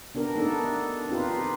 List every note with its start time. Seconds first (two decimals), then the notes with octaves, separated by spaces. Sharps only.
0.15 B3 D4 G4 A#4
0.35 A3 B3 D4 D#4 A4
1.09 C4 D#4 F4 G4 B4